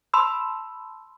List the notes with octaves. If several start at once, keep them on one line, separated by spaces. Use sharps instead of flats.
A5 B5 C6 E6